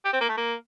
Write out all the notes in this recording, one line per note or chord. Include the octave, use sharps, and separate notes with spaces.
G4
C4
A#3
A3
A#3